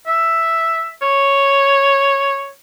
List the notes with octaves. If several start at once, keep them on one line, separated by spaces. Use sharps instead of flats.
E5
C#5